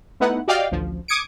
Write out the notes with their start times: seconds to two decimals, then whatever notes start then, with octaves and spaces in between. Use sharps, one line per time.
0.20 A3 B3 D#4 E4 B4 F#5
0.48 F#4 G4 D5 D#5 F5 G5
0.71 A1 D2 F3
1.08 D6 D#6 G#6 C#7 D7